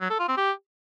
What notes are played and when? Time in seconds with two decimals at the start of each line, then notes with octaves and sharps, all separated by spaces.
0.01 F#3
0.10 A4
0.19 F4
0.28 C4
0.37 G4